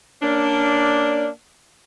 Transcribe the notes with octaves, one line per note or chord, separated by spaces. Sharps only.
A#3 C#4 D4